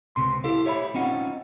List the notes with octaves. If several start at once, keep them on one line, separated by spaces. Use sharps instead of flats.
C#2 C3 C6
E4 G4 A4 F5
G4 C#5 E5 G#5 B5
C4 C#4 D#4 F4 F#5